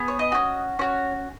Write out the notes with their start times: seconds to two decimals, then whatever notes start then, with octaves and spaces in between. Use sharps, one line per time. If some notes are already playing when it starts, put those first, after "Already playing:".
Already playing: B3 G#4
0.08 C#5
0.19 D#5
0.32 C#4 F#4
0.79 C#4 F#4 C#5